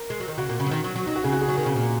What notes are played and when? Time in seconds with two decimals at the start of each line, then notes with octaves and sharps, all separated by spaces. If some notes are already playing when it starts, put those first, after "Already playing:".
Already playing: A#4
0.10 G#3
0.20 F#3
0.28 D#3
0.38 C#3 F#4
0.49 A#2
0.60 C#3
0.66 F#3
0.71 D#3
0.84 F#3
0.95 F#3
1.06 F#3 D#4
1.16 F#4
1.24 C#3 G#4
1.32 F#4
1.41 G#4
1.48 F#3
1.58 D#3
1.66 C#3
1.76 A#2